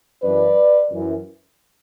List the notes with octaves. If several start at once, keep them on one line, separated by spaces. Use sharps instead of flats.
F#2 E3 B4 D5
F#2 E3